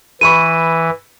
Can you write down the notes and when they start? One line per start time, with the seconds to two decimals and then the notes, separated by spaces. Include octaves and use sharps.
0.21 E3 B4 B5 C#6 D#7